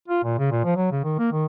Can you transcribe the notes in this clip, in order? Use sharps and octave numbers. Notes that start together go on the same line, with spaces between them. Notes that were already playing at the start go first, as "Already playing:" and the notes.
F4
A#2
C#3
A#2
F3
F#3
C#3
D#3
A#3
D#3